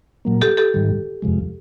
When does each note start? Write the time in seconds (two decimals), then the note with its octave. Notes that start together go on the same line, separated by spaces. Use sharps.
0.25 A#2 F#3 A#3
0.41 G4 A4
0.57 G4 A4
0.74 G#2 D#3 G3
1.22 F2 C3 F3 G#3